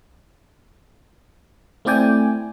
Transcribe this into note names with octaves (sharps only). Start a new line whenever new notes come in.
A3 C4 E4 D5 G5 G#5